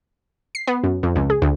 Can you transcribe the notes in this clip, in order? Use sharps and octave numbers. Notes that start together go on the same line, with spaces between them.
C7
B3
F#2
F2
C#2
G#4
D2